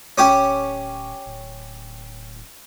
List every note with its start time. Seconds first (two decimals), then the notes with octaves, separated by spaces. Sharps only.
0.18 D1 C#4 G4
1.26 D1